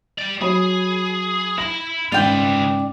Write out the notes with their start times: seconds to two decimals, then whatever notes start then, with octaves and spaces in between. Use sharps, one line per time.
0.18 D5 G5
0.41 F#3 G#4 C#5 B5
1.58 E4 B5 A#6
2.12 G#1 C#3 F4 B4 D5 G5